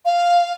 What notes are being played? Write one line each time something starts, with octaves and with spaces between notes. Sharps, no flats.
F5